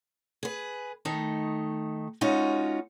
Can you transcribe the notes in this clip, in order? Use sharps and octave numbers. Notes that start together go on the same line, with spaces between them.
G#4 B4
D#3 A3 D#4
G#3 C#4 D#4 F4 F#4